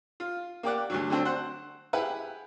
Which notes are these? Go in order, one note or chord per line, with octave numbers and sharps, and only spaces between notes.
F4
A#3 G4 D5 F#5
D2 G2 F#3
D3 F#3 C4 D4
C5 F#5
E4 G4 G#4 B4 F#5